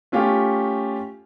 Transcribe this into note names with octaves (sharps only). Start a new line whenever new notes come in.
A3 C#4 F4 G4